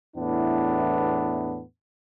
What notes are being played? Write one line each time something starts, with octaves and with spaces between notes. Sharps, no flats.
E2 A2 B3 D4 E4